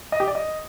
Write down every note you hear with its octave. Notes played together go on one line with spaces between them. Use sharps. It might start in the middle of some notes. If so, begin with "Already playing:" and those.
D#5
G4
D5
D#5